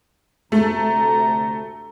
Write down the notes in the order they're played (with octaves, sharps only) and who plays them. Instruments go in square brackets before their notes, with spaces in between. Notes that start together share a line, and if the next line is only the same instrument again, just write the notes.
[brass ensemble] D2 C3 A#5 [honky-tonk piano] A3